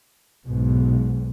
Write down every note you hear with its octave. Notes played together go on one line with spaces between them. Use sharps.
B1 G#2 B2